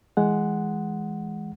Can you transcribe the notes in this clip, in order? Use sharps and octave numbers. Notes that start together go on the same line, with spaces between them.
E3 G#3 F#5